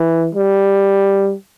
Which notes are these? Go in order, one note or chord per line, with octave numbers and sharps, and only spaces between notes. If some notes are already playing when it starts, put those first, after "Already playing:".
Already playing: E3
G3